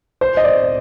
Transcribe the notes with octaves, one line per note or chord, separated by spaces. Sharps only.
C5
D#5
D5